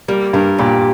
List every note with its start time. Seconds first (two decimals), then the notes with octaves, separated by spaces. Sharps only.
0.08 G3 A#3
0.33 G2 A#4
0.58 A#2 G4